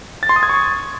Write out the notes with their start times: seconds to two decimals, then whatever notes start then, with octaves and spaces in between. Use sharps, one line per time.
0.23 A6
0.29 C6
0.36 D#6
0.43 G#6
0.49 C#6